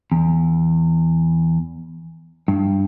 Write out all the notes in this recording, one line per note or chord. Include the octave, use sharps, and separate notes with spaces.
E2
G2